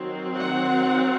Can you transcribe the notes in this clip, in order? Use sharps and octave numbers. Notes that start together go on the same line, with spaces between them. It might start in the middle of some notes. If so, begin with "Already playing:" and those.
Already playing: D#3 F#3 C4
F#5